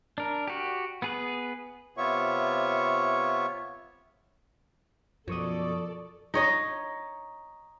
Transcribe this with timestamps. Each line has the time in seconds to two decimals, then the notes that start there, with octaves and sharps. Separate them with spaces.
0.18 D4 A#4
0.48 F#4 G4
1.02 B3 G#4 B4
1.97 C3 B3 F4 C#5 E5 C#6
5.28 F#2 B2 F3 A4 D5 C#6 D#6
6.34 D#4 C#5 D#5